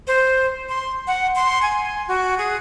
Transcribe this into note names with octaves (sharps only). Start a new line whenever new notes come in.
C5
C6
F#5
C6
G#5
F#4
G#4